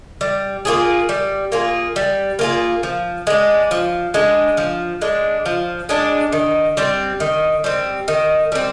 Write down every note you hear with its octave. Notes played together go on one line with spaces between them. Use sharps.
G3
A#3 F4 G#4
G3
A#3 F4 G#4
G3
A#3 F4 G#4
F3
G#3 D4
F3
G#3 D4
F3
G#3 D4
F3
G#3 D4
D#3
G3 C4
D#3
G3 C4
D#3
G3 C4